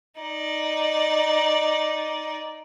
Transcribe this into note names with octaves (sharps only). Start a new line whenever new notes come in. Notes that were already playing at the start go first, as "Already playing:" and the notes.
D#4 D5